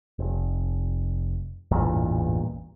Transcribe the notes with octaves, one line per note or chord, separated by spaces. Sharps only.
F1
A1 E2 G2 A#2